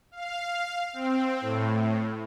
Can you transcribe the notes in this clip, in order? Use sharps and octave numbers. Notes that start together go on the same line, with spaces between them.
F5
C4
A2